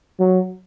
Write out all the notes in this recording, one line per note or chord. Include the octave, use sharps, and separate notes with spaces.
F#3